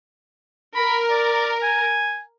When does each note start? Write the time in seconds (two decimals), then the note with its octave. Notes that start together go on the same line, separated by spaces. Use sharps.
0.75 A#4 B5
1.10 D5
1.63 G#5